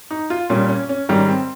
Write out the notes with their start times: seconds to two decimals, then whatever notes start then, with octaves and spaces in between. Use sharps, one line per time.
0.11 D#4
0.30 F4
0.50 A#2 G3 C#4
0.69 C#4
0.89 C#4
1.09 G#2 D#3 G3 C#4
1.28 C4